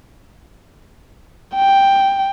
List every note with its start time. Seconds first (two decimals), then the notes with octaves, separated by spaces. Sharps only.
1.55 G5